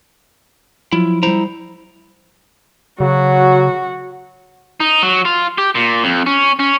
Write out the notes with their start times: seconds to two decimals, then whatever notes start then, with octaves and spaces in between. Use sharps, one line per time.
0.93 F3 F#3 E4 F4
1.23 G3 E4 C5 A#5
3.00 C#3 F#3 F#4
4.80 D#4
5.02 F#3
5.25 F4
5.58 G4
5.75 A#2
6.04 F2
6.26 C#4
6.59 C#4